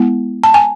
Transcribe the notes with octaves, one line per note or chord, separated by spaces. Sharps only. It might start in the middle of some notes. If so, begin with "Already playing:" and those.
Already playing: G#3 B3 E4
A5
G#5